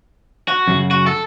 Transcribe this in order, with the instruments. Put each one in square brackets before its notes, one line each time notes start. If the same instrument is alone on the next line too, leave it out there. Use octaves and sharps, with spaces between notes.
[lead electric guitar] F#4
[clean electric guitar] F#2 C#3
[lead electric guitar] F#4
A4